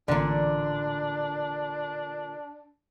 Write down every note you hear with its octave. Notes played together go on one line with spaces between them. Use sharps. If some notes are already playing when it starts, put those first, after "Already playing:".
A1 A#2 D3 D4